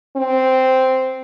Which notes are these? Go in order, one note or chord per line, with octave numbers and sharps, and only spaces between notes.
C4